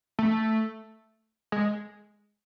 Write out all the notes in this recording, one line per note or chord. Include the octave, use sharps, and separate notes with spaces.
A3
G#3